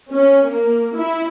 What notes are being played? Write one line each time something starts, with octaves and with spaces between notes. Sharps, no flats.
C#4
A#3
E4